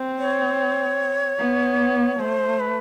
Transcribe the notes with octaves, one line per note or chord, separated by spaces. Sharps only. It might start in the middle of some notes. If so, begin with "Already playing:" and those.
Already playing: C4
C#5
B3
A3 C5
B4